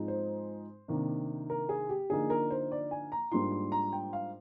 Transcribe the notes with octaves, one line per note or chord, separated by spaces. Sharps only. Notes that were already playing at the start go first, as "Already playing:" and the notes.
Already playing: G#2 F3 G#3 C4 D#4
C5
C3 D#3 A#3 D4
A#4
G#4
G4
D3 F3 A#3 D#4 G#4
A#4
C5
D5
G#5
A#5
G#2 G3 A#3 D4 F4 C6
C6
A#5
G5
F5